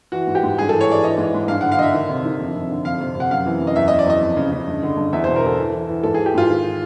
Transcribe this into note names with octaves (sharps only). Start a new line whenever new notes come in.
E3 F#4
G#2
G4
G#2
G2 G#4
E3 A4
C#5
E3 D5
E3 D#5
G#2
G#2
G2 F5
D3 F#5
F5
D3 D#5 E5
D#3
C3
D#3
F2
F2
D3
F2 F5
C3
C3
F#5
F#2 F5
E3
F#2
D#5
E2 E5
E2 D#5
D5
E2 D#5
F2
C#3
C#3
G2
D3
G2
E2 E5
B2 C5
A#4
E2 A4
E3
E3
E3
G#2 A4
E3 G#4
G4
G#2 F4
D#3